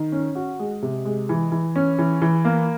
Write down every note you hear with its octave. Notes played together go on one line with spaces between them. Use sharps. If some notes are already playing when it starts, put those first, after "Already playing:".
Already playing: D#3
C#4
F#4
G#3
C3
G#3
E3
E3
C#4
E3
E3
A#3